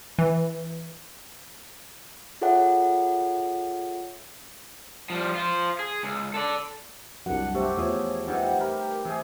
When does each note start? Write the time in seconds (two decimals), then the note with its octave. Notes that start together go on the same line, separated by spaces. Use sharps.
0.19 E3
2.41 F4 G#4 A4 C#5 E5 F#5
5.10 F3 G3
5.35 F4 C5
5.79 G#4
6.03 C#2
6.34 A4 D5
7.26 C2 F#2 D4 F#5
7.55 A3 G4 C5 E5
7.77 E2 F3 G#4 C#5
8.27 C3 G3 A3 D#4 B4 F#5
8.61 G4 A#4 B5
9.05 C3 E3 G#4